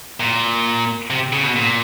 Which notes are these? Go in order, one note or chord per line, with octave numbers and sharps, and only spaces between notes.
A#2
C3
C#3
B2
A#2